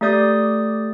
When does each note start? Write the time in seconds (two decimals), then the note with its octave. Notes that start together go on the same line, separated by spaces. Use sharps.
0.01 A3 G4 D5 D#6 G6